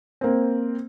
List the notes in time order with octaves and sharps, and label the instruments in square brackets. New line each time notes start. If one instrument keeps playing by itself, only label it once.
[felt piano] A#3 C4